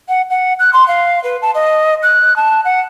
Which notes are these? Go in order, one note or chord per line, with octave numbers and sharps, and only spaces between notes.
F#5
F#5
F#6
C6
F5
B4
A5
D#5
F#6
A5
F#5